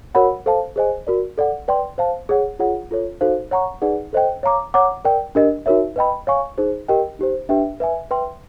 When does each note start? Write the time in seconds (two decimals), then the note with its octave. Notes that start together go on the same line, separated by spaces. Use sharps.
0.15 F#4 A#4 C#5 F#5 B5
0.46 A4 C5 F5 A5
0.76 G#4 C5 D#5 G#5
1.07 F#4 A#4 D5
1.37 A4 D5 F#5
1.68 B4 D5 G5 C6
1.98 C5 F5 A5
2.29 G#4 C#5 F#5
2.59 F4 G#4 C#5 F#5
2.91 F4 A4 C#5
3.21 D#4 F#4 A4 C5 F5
3.51 C#5 F#5 A#5 C#6
3.82 D#4 G#4 B4 D5 F#5
4.13 A4 C5 D#5 G5
4.43 C#5 F5 A#5 D6
4.74 C#5 F#5 A#5 D6
5.05 A#4 D5 G5
5.35 D4 G4 A#4 D#5
5.66 D#4 F#4 A#4 C#5 E5
5.96 B4 D#5 G5 B5
6.27 C#5 F5 G#5 C#6
6.58 D#4 G#4 C5
6.89 G4 A#4 D#5 G5
7.19 D#4 G4 C5
7.49 D4 G4 B4 E5 G5
7.80 B4 E5 G#5
8.11 B4 E5 G5 C6